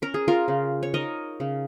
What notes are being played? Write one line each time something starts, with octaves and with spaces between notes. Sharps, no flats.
C#4 A#4
G#4
F4 A#4
C#3
C#5
D#4 A#4 D#5
C#3